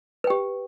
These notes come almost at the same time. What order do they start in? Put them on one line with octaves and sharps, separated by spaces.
B4 G5 G4